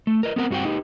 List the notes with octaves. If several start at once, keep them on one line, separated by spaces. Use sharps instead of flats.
A3
A#4 B4 D#5
B3 C4 A#4 F#5
G2 C4 F#4 G#4 F#5 G5
D#4 G4 B4